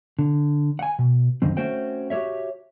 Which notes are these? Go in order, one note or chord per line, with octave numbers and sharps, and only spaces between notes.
D3
F#5 G#5
B2
C#2 F#2 D3 D#3 C4
A3 C4 C#4 F#4 C5 G5
F#4 G4 A4 C#5 E5